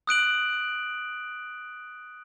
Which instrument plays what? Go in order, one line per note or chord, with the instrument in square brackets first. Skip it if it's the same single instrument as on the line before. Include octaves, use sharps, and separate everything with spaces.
[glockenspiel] D#6 F#6 D7 F#7